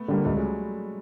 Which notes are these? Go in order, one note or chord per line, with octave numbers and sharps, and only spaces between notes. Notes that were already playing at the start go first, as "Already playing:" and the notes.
Already playing: A3 B3
D3 G3 A#3
C#2 G3 A3
F#3 G#3